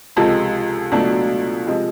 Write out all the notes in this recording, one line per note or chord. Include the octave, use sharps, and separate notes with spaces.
C#2 C3 F3 G#3 C4 A4
C#2 B2 F#3 A3 D4
C3 F3 G#3